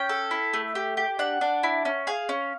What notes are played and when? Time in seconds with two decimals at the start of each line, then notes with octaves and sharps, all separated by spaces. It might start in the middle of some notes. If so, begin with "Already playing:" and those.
Already playing: C#4 G5
0.09 A4
0.31 E4
0.53 A3
0.75 G4
0.97 G4
1.19 D4 F#5
1.41 D4
1.63 E4
1.85 C#4
2.07 G#4 F5
2.29 C#4